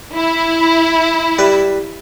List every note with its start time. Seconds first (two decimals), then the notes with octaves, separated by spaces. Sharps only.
0.16 E4
1.39 G3 B4